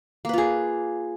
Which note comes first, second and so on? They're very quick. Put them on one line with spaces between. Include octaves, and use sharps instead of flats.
A#3 B4 F4 G#4